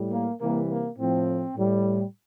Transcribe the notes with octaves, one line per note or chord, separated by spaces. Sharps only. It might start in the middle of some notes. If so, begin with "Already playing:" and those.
Already playing: A2 G3
A#3
C3 E3 G3 A#3
A#3
A2 F3 C4
A2 G3